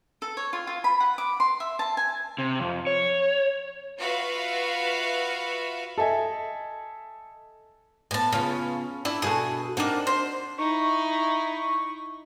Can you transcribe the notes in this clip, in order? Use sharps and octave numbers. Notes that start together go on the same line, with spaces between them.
A4
C#5
F4
F4
B5
F#5
D6
C6
E5
A5
G#5
C3
F2
C#5
F4 F#4 B4 E5 F5
A4 D#5 E5 G#5
A2 B3 G#5 A5
C#3 B3 C#4 F4
D4 E4
B2 F#4 G#4 A4
A#3 C4 D4 D#4 F#5
C5
D#4 E4 C#6